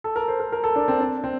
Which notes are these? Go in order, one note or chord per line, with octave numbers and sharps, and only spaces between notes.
A4
A#4
C5
A#4
A#4
A4
D4
C4
D4
C4